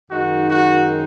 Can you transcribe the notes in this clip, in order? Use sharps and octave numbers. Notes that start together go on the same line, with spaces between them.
F#2 D#3 G#3 D#4 F#4
F#4